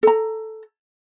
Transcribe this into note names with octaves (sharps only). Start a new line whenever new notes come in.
A4 A#5